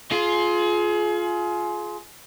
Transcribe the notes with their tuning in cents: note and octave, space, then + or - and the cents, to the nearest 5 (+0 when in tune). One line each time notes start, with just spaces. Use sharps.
F4 +0 G#4 +30